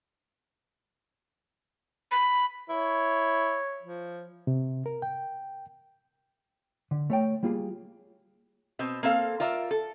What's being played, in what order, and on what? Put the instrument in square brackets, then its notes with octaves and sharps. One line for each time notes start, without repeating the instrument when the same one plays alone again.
[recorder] B5
[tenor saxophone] E4 [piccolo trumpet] C#5
[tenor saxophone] F3
[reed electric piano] C3
A#4
G5
[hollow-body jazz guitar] D3
A3 C#5 G5
G3 A#3 F4 G#4
[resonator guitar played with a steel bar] B2 C4
A#3 C4 A4 F5
F4 A#4 D5 E5
A4